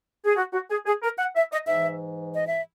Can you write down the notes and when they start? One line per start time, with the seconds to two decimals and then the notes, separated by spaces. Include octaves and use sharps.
0.26 G#4
0.37 F#4
0.53 F#4
0.70 G#4
0.86 G#4
1.03 A#4
1.19 F#5
1.36 E5
1.52 D#5
1.67 G#2 E3 E5
2.34 D#5
2.48 E5